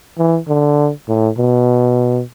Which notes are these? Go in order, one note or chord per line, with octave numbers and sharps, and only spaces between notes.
E3
D3
A2
B2